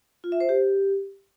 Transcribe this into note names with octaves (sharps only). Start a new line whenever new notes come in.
F4
E5
C5
G4